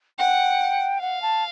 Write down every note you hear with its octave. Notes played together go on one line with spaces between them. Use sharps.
F#5 G5
F5 F#5
A5